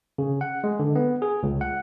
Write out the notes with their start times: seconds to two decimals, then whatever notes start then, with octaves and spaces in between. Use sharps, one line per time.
0.18 C#3
0.41 F#5
0.64 G#3
0.79 D3
0.95 B3
1.22 G#4
1.43 C#2
1.61 F#5